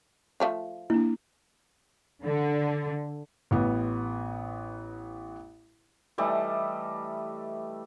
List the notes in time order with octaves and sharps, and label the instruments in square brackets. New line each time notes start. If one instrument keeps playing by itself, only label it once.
[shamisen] F3 A3 F4
[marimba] A#3 D4 [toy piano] E4
[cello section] D3
[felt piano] A1 B3
[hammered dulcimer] E3 G3 A3 D#5